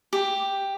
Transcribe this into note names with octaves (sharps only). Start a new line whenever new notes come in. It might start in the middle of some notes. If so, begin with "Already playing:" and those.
G4